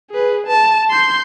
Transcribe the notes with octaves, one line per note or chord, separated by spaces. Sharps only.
G#4 B4
A5
C6 G6